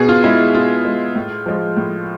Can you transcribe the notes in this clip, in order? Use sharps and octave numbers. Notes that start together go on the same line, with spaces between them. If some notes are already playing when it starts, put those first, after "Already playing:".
Already playing: B2 G#4
F4
G#3 E4
B2 F4
G#3
A2
F3 G#3
A2